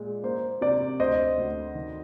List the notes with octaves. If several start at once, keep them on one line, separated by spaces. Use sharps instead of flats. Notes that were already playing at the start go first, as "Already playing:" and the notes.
Already playing: A#2 G#3
A#3 C5
C3 D5
D2 C5 D#5
D2
D#3